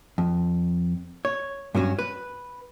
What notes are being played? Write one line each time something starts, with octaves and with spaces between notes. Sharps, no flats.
F2
C#5
G2 F#3 C#4 F#4
B4